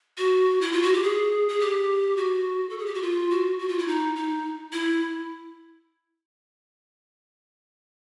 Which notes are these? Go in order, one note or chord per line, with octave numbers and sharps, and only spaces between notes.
F#4
E4
F4
F#4
G4
G#4
G#4
G4
F#4
A4
G#4
G4
F#4
F4
F#4
F#4
F4
E4
D#4
D#4
E4